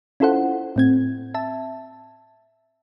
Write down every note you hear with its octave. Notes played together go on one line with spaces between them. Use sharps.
C#4 E4 F4 A4 C5 F#5
A2 C4 G#6
E5 A5